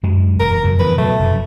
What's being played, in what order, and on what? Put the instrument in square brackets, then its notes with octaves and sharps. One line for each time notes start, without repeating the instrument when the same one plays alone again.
[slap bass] F#2 F#3 G#3
[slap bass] E1 [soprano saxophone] A#4
[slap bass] F#2 C#3
[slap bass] E2 C#3 F3 [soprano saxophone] B4
[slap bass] B2 F#3 [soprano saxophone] A3
[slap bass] F1 F#2